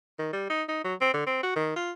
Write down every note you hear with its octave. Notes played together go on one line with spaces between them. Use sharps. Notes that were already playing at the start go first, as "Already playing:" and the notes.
D#3
G3
D#4
D#4
F#3
C4
D3
C4
F#4
D#3
F4